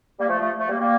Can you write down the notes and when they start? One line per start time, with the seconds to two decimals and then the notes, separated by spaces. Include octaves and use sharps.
0.19 G3 A#3
0.28 F3 A3
0.39 F3 A3
0.59 F3 A3
0.69 G3 A#3
0.79 G3 A#3